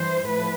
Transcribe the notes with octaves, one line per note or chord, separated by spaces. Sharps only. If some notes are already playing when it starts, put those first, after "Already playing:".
Already playing: G2 E3 C5
A2 F3 B4